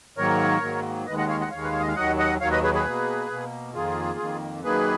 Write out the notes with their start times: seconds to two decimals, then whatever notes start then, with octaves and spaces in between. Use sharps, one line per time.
0.17 G#2 D#3 F#3 A#3 A#4 C#5
0.62 G#2 D#3 F#3 A#3
1.06 D#2 D#3 G#3 B4 D#5
1.18 D#5 F#5
1.29 C#5 F5
1.40 D#5 F#5
1.51 D#2 D#3 G#3 C#5 F5
1.63 B4
1.72 C#5
1.80 D#5
1.87 F5
1.96 D#2 D#3 F#3 D#5 F#5
2.19 D#5 F#5
2.41 D#2 D#3 F#3 C#5 F5
2.51 B4 D#5
2.63 G#4 B4
2.74 G#4 B4
2.86 B2 A#3
3.31 B2 A#3
3.74 F2 D#3 A#3 F4 G#4
4.19 F2 D#3 A#3
4.64 F#2 D#3 A#3 G#4 B4